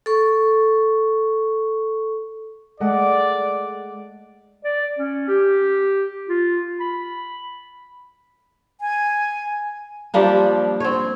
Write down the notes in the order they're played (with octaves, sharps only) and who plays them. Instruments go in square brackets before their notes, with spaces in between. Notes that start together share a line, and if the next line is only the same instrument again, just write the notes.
[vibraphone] A4 C#6
[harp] G#3 A3 F#5 [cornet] D5
[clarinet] D5
C#4
G4
F4
B5
[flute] G#5
[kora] F3 G3 A#3 D4
C4 C#5